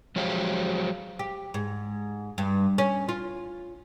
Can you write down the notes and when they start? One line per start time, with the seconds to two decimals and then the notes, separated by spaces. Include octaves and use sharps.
0.16 F3 F#3 G#3 G4 C5 F5
1.19 G4
1.54 G#2
2.38 G2
2.78 C#4
3.09 F4